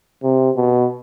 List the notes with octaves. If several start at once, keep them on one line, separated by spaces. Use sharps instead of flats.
C3
B2